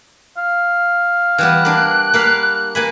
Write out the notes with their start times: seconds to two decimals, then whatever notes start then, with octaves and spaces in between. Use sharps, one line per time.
0.38 F5
1.38 E3 G3 B3 F#6
1.65 A#3 D4
2.14 A#3 F5 B5
2.75 A#3 G#5 B5